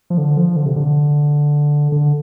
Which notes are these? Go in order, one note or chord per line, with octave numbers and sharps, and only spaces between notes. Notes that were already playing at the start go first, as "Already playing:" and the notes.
F3
D3
F3
D3
C3
D3
D3